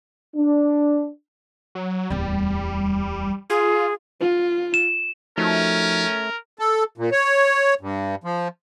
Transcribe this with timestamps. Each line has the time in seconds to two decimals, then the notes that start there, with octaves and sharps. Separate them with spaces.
0.36 D4
1.75 F#3
2.10 D1 E2 G3
3.50 F4 G#4
4.21 F4
4.74 E7
5.38 F3 A3 C#4 D#4 F#4 A#4
6.59 A4
6.98 A#2
7.12 C#5
7.81 G2
8.24 F3